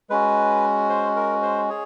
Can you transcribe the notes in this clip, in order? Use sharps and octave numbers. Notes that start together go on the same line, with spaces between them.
G#3 C#4 F#4 B4
C5
A#4
C5
G#4 C#5